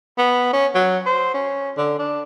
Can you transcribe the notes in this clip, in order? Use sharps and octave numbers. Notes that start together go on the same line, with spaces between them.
B3
C#4
F#3
C5
C#4
D3
D4